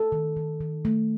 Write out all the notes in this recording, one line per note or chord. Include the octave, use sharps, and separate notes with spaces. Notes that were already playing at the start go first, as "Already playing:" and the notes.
Already playing: A4
D#3
D#3
D#3
A3